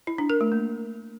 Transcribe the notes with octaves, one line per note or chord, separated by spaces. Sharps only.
E4
D4
A#4
A3
A#3